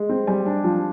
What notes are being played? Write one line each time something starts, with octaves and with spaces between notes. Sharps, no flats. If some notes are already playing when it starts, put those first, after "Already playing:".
Already playing: G#3
C4
G3 G#5
D4
F3